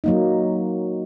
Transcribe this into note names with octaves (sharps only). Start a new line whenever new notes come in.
F#3 A#3 D#4